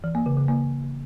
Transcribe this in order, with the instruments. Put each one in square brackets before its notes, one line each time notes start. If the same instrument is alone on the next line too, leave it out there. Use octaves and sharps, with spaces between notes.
[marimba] E3
A#3
C#3
C#3
A#3